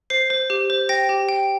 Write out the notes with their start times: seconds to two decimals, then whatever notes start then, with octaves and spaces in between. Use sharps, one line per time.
0.10 C5 C7
0.30 C5
0.50 G4
0.70 C5
0.89 G5 A#6
1.09 G4
1.29 G5